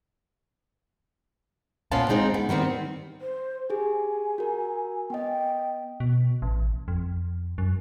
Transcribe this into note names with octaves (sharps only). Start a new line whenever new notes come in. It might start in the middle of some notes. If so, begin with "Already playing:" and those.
A#2 B3 C#4 C5 F5 A5
G#3 C4 D#4 G#4
B3
D#3 G3 B3 C4
C5
G4 G#4 G#5
F#4 A#4
B3 D#5 G5
B2
A1
F2
F#2